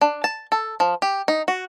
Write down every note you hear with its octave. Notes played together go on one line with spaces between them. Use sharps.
D4
A5
A4
F3
G4
D#4
F#4